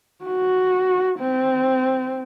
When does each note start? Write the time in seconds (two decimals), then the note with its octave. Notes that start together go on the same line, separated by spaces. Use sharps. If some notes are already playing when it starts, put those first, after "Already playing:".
0.25 F#4
1.19 C4